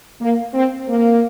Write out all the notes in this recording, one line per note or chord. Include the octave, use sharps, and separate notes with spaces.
A#3
C4
A#3